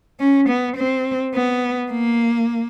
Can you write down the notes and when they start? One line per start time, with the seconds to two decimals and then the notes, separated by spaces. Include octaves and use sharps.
0.20 C#4
0.49 B3
0.77 C4
1.34 B3
1.92 A#3